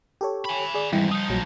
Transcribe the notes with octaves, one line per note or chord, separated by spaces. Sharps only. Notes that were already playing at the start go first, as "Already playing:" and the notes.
G4 A4 C#5
G#5 B5
G#4 D5
F2 G#2 E3 G3 E4
F3 D#4 D#6
A#1 A#2 F#3